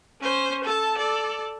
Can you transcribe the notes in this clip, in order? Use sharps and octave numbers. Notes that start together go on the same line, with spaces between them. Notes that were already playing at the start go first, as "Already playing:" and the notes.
C#4 C5
A4 A5
A4 D5